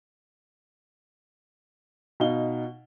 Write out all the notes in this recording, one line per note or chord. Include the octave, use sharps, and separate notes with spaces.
B2 D#4 F5 G7